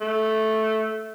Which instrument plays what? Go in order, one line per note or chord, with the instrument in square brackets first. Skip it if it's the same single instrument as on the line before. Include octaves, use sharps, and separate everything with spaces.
[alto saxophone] A3